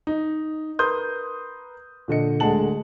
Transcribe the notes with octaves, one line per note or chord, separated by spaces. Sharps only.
D#4
A#4 B4 C6 D#6 G6
A#2 D3 D#5 C#7
D1 D3 G#3 F#5 A5 F#7